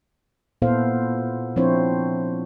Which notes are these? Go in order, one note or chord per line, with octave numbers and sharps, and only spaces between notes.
A#2 B3 E4 A4 C5 F5
F3 C4 D4 E4 C5 C#5